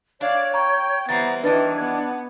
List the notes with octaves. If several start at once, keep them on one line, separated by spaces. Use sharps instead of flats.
D4 C#5 D5 F5
G5 A#5 C#6
E3 G3 B3 C4 A#5 A6
D#3 E3 G3 D4 B4 A6
B3 G#6